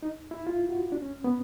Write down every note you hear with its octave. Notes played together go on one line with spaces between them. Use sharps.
D#4
E4
F4
F#4
D4
C#4
B3